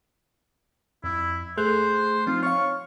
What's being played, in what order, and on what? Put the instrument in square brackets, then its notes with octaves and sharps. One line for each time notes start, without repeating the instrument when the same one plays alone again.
[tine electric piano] F2 [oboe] E4
[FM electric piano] A3 [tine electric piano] G#4 F#6 G6 [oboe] C5
[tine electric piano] F3 C4 D#4 [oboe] F4
[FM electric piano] C#5 F5 [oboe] C#6 [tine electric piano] F6